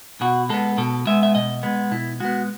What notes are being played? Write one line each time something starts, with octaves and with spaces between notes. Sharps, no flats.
B2 F#4
G#3 B3 A4
B2 A4
G#3 B3 E5
E5
B2 D#5
G#3 B3
B2 E4
G#3 B3 F#4